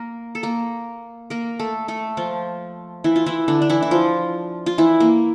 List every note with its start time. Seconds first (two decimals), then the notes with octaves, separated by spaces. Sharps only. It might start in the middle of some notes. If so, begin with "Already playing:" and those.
Already playing: A#3 A#4
0.35 A4
0.43 A#3 A#4
1.30 A#3 A#4
1.59 A3 A4
1.88 A3 A4
2.17 F3 F4
3.04 E3 E4
3.16 F4
3.26 E3 E4
3.48 D3 D4
3.62 D4
3.70 E3 E4
3.82 E4
3.91 F3 F4
4.66 F4
4.78 E3 E4
5.00 A#3